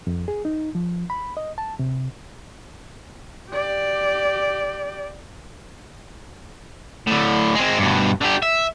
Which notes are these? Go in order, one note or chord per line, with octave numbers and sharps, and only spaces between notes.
F2
G#4
D#4
F3
B5
D#5
A5
C3
G4 D5
A2 D3
G#3 C4
G2 B2
D3 G4
E5